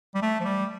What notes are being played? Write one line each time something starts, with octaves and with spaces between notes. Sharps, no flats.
G3
A3
F3
G3